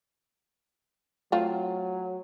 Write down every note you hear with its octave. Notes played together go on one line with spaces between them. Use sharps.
F#3 A3 C4 F4